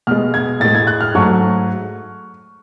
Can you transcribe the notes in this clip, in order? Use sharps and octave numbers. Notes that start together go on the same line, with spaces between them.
B2 G#3 F6
G#6
A2 G#3 A6
G#6
F#6
F6
G#2 F#3 A3 C#6